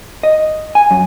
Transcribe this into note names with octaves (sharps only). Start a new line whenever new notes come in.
D#5
G#5
F#2